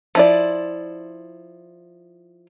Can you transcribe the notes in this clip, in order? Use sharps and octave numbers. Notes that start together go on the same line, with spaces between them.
F3 E4 D5